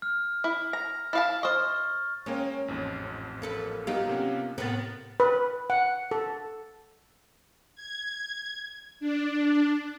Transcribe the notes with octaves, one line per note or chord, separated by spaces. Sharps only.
F6
E4
A#5
E4 F5 A5 A6
C5 D#5 C#6 F6
G#3 A#3 C#4 G5
A1 F2 G#2
A#3 A4 B4
F#3 B3 D#4 F4 G4
C3 A#3 C#4
A2 C3 B3 A#4 A6
B4
F#5
A4
G#6
D4